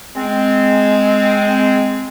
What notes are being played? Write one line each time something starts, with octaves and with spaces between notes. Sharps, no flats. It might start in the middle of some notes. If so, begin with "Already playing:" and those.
G#3 C4